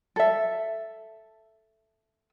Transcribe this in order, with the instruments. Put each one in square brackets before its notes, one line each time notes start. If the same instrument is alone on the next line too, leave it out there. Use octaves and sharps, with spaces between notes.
[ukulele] A4 E5